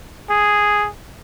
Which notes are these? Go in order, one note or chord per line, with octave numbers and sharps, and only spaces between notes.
G#4